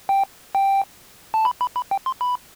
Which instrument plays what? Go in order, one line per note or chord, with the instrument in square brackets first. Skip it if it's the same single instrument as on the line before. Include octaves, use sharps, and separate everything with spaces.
[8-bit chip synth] G5
G5
A5
B5
B5
B5
G5
C6
B5